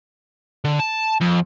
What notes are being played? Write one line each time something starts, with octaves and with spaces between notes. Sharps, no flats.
D3
A5
F2